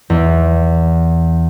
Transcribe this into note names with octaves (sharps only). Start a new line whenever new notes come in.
E2